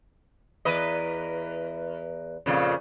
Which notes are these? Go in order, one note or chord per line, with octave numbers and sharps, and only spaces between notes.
E2 B4 D#5
F2 A#2 C#3